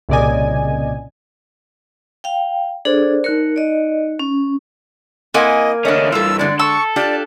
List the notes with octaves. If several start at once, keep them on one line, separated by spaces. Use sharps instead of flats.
C2 A#2 C#3 D5 D#5 G#5
F5 G5
D4 G#4 A4 C5 D5
D#4 A#4 F#6 C#7
D5 D#5
C#4
A#3 C4 E4 D#5 F#5 G#5
D3 A3 C#4 D4 D#5
G2 E3 F4 A4 E6
D3 G#3 D5
A4 C#6 E6
D4 F4 G4 D5